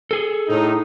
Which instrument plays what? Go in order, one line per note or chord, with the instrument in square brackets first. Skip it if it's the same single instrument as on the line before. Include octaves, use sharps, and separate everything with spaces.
[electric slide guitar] G#4 A4
[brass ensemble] A2 D#4